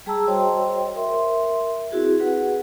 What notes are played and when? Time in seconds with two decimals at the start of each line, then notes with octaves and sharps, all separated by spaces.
0.06 G3 G#4 A5 A#5 E6
0.27 F#4 C5 C#5 D#5 G5 C6
0.95 A#4 E5 C6
1.92 C4 E4 F#4 G#4
2.20 F#4 G#4 B4 F#5